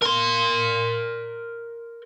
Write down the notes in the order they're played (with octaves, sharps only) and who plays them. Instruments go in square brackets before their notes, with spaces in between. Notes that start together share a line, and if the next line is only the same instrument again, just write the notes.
[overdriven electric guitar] A#4 C6